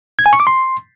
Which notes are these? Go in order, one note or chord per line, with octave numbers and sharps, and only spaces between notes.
G#6
G#5
C#6
D6
C6